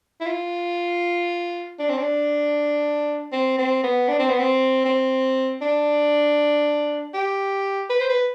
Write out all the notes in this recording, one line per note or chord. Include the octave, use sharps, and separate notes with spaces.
E4
F4
D4
C4
D4
C4
C4
B3
D4
C4
B3
C4
C4
D4
G4
B4
C5
B4